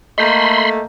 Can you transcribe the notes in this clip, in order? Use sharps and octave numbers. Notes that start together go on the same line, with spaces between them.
A3 A#3 D#5 B5 C6 G6